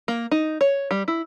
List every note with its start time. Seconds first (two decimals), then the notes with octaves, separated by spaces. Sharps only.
0.08 A#3
0.31 D#4
0.61 C#5
0.91 G3
1.08 E4